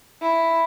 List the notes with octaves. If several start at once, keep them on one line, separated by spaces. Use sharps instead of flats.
E4